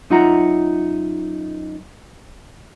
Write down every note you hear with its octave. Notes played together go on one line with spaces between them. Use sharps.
F#2 D#4 F4 E5 F#5 A#5